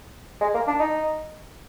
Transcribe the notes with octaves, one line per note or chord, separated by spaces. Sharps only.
G#3
A#3
D4
D#4